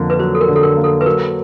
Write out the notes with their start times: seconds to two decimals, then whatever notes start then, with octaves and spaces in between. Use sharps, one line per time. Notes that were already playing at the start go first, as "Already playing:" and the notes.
Already playing: F2 D3 A#3
0.10 B4
0.19 F#3 C5
0.35 A4
0.41 A#4
0.48 D3
0.56 A4
0.63 A#4
0.77 A#3
0.84 A4
1.01 B4
1.06 F#3 A#4